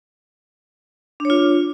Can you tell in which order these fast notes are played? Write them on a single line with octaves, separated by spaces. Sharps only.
D4 C#5 F4